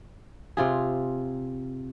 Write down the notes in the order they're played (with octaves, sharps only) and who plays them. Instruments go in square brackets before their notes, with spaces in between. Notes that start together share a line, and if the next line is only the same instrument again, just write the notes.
[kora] C3 F4 G#4